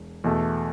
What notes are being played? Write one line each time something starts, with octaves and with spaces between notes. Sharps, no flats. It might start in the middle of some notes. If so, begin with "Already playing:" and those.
Already playing: E1
E2 B2 A3